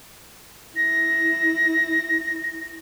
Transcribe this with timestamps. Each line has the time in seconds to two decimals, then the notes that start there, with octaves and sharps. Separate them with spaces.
0.76 E4 A#6